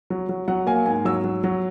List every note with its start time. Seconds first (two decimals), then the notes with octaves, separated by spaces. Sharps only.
0.10 F#3
0.29 F#3
0.48 F#3 F#5
0.67 A#3 G#5
0.86 G#2 G#5
1.05 F#3 E6
1.24 F#3
1.44 F#3